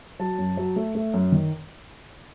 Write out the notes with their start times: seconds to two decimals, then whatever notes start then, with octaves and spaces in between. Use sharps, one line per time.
0.19 F#3 A5
0.38 F#2
0.57 F#3
0.76 A3
0.95 A3
1.14 F#2
1.32 D#3